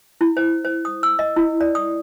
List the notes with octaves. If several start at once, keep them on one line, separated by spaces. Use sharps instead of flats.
E4
C5
C5
D#6
E6
D#5
E4
D5
D#6